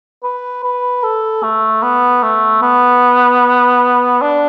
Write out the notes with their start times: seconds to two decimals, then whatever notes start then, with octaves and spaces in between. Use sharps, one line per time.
0.23 B4
0.63 B4
1.04 A4
1.43 A3
1.83 B3
2.23 A3
2.62 B3
4.22 D4